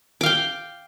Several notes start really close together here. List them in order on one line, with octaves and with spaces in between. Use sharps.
D6 F5 G5